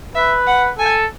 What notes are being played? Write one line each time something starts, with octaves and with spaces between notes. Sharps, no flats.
B4 E5
F#5
A4 G#5